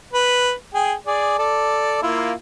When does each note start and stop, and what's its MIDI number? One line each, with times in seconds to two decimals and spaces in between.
0.13 0.52 71
0.74 0.94 68
0.74 0.94 79
1.07 1.39 68
1.07 1.39 74
1.39 2.01 69
1.39 2.01 74
2.02 2.33 58
2.02 2.33 64
2.02 2.33 65